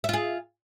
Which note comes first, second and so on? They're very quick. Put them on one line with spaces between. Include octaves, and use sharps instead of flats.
E5 F4 G#4